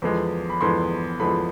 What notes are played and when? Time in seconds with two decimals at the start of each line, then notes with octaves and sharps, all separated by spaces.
0.02 E2 D3 F3 G#3
0.50 B5
0.61 E2 D3 F3 G#3 C6
1.20 E2 D3 F3 G#3 B5